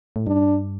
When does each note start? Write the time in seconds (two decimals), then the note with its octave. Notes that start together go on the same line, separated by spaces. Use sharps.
0.16 A2
0.27 G2 D4